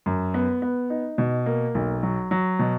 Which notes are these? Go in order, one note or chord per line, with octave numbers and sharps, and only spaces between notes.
F#2
B3
B3
D#4
B2
A#3
B1
F#3
F#3
B2